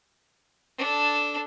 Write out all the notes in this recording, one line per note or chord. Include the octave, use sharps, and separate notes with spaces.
D4 A4